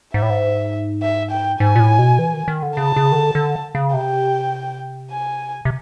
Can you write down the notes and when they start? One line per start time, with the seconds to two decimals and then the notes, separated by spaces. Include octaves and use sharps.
0.14 G#2 E5
0.22 A2
0.30 G#2
1.02 E5
1.31 G5
1.60 G#2 G#5
1.75 A#2
1.80 A2
1.99 B2
2.19 E3
2.34 D#3
2.48 D#3
2.63 D3
2.77 C#3 A5
2.96 C#3
3.12 D#3
3.15 D3
3.35 D3
3.75 C#3
3.94 C3 G5
5.11 G#5
5.65 C3